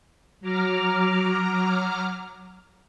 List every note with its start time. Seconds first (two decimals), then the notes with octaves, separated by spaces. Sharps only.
0.41 F#3 A#5 D6 F6